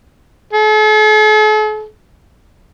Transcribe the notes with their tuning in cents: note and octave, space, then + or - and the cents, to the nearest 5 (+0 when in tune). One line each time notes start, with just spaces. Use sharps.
A4 -45